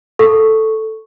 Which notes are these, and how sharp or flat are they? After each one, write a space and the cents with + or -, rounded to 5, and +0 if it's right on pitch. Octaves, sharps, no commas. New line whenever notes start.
A4 +0 C#6 +0